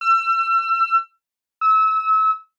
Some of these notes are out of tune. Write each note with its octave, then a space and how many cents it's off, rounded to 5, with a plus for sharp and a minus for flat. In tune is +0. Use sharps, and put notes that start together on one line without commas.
E6 +35
E6 -30